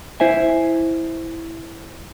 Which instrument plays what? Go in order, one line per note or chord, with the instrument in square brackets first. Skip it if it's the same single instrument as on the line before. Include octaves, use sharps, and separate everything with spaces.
[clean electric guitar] E4 C5 E5 G#5